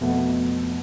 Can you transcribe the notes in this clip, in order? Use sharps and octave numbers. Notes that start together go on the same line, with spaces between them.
F2 B2 A3 B3